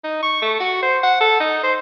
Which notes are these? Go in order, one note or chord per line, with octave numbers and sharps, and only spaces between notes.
D#4
C#6
A3
F#4
C5
F#5
A4
D#4
C5